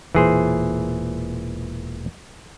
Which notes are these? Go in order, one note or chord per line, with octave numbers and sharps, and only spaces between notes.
E1 A#2 E3 G#4 C5